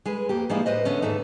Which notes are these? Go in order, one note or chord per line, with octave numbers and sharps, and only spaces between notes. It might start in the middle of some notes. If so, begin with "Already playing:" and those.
G#3 G#4 B4
F2 A#3 G4
F3 G3 G#3 A#3 D#4 E4
A2 B4 C5 D#5
D3 B3 C#4
F2 G#2 D#3 A3 D#4